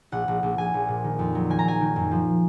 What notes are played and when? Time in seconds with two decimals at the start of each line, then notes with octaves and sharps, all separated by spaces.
0.12 A#1 F#5
0.28 A#1
0.43 A#1
0.58 A#1 G#5
0.74 A#1
0.88 A#2
1.04 D#3
1.19 F2
1.35 F#3
1.50 D#3 G#5
1.59 A#5
1.65 F#3 G#5
1.81 D#3
1.96 F#2
2.11 F3